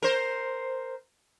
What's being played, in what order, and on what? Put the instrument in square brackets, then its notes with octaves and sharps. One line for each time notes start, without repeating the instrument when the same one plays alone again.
[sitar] A#4 C5